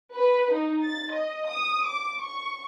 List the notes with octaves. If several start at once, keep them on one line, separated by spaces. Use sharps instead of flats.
B4
D#4
A6
D#5
D#6
D6
C#6